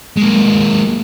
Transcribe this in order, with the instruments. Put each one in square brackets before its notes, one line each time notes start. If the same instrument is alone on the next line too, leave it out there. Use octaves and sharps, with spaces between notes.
[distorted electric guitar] G#3 A#3